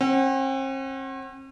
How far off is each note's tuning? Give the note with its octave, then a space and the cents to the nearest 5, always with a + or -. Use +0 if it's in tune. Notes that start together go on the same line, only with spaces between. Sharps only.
C4 +45 F#5 +30